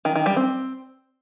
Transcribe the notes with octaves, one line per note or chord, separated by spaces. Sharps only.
D#3
D#3
G3
C4